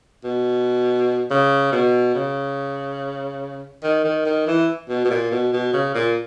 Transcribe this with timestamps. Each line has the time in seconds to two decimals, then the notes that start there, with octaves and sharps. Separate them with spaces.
0.24 B2
1.31 C#3
1.72 B2
2.15 C#3
3.83 D#3
4.04 D#3
4.26 D#3
4.47 E3
4.89 B2
5.05 B2
5.11 A#2
5.31 B2
5.53 B2
5.73 C#3
5.95 A#2